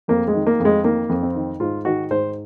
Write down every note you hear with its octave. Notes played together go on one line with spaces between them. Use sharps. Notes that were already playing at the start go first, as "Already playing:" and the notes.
F2 A#3
G#3
D#3
A#3
F2
G#3
D#3 A#3
F2
C4
D#3
G#2 F4
D#3 F#4
G#2 C5